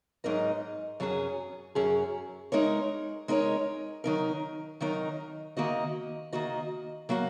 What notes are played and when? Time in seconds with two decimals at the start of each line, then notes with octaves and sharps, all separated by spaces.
0.24 G#2 F#3 D#4 A#4 D#5
1.00 F#2 F#3 C#4 G#4
1.75 F#2 F#3 C#4 G#4
2.52 G#3 D#4 A#4 C#5
3.28 G#3 D#4 A#4 C#5
4.04 D#3 F#3 D#4 A#4
4.81 D#3 F#3 D#4 A#4
5.57 D#3 A#3 F#4 D#5
6.33 D#3 A#3 F#4 D#5
7.09 F#3 A#3 F#4